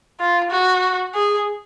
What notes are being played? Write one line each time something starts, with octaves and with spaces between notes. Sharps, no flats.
F4
F#4
G#4